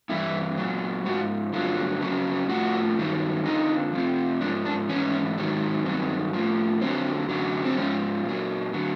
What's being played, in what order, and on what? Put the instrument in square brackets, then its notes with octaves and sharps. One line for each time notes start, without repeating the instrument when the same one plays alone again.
[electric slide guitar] G2 E3 E4
A#2 F#3
G#2 F3 F#4
G2 D3 F#3 F4
F2 C#3 F#3
A2 F3 F#4
G2 D#3 F#3
F2 D3 F3 D#4
F2 C3 F3
G#2 F3 D4
D4
G#2 E3 C#4
G#2 D#3 F#3
G2 D#3 F#3 C4
A2 F3
F2 D3 F#3 C4
F#2 D3 F#3
C4
G#2 F3 C#4
A#2 F#3
D3 F#3